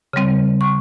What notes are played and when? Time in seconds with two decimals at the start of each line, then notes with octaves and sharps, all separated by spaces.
0.13 C#3 G3 C4
0.61 C#6